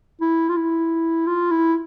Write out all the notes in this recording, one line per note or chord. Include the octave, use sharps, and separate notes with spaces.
E4
F4
E4
F4
E4